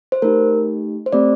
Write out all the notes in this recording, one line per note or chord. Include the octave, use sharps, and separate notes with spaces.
C5
A3 D#4 G4 A#4
C5
A3 C4 G4 D5